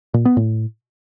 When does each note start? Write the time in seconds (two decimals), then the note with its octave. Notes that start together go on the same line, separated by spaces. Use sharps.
0.14 A#2
0.25 B3
0.37 A2